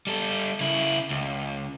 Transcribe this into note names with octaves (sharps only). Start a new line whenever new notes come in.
G3 A4
C#3 E4
C#2